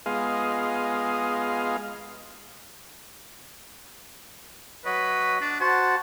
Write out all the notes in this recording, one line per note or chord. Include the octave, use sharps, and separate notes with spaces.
G#3 B3 F4 G#4 D#5 F5
F#3 B4 C#5 D#5
D4
F#4 C5 F#5 A5